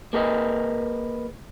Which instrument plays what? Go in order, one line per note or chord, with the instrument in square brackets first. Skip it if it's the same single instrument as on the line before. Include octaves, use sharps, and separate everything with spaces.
[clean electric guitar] A#3 G#4 A#4 B4 D#5